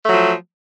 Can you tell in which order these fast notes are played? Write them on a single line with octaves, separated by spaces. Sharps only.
A3 F#3 F3